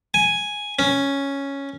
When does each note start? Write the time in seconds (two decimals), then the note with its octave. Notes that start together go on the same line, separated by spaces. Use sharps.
0.14 G#5
0.79 C#4